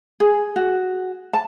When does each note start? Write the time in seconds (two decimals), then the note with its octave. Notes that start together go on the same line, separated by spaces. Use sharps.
0.20 G#4
0.56 F#4
1.33 A5